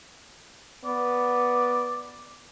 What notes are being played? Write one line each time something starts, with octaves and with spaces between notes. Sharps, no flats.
B3 D5